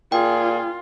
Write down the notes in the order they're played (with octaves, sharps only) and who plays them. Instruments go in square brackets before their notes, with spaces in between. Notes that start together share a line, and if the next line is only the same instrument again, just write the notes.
[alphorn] A#2 [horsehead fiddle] F4 [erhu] G#4 [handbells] G5